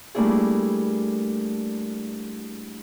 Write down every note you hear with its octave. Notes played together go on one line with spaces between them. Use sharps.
G3 A3 A#3 D4 E4 G#4